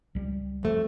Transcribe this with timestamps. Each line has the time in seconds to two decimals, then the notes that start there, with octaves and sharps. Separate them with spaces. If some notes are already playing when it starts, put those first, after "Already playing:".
0.15 C#2 G3
0.63 F2 A3